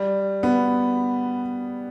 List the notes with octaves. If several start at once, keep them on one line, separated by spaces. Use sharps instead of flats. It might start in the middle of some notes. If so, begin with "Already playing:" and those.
Already playing: G3
B3